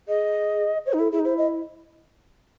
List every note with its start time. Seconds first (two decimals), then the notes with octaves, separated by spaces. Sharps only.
0.08 G#4 D#5
0.86 C5 C#5
0.93 D#4
0.99 E4 A4
1.12 E4 G#4
1.19 D#4
1.25 E4 C5
1.38 D#5